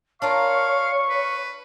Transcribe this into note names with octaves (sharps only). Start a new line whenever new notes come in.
D4 F4 A#4 C#5 F5 C#6
B4